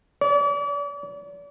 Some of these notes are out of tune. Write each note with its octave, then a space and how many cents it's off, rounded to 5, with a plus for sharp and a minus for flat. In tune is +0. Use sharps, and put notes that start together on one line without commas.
D5 -40